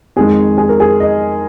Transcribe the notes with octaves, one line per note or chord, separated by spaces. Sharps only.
F2 D#3 G#3 G#4
G#4
A#4
G#4
D#5